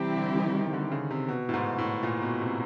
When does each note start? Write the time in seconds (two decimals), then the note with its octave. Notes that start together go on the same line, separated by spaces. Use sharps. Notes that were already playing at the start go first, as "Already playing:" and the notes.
Already playing: C3 E3 G3 C4 E4 G4
0.17 D3
0.35 D#3
0.54 D#3
0.73 D3
0.92 C#3
1.10 C3
1.28 B2
1.49 A2
1.53 G#2
1.78 A2
2.03 A#2
2.22 B2
2.41 C3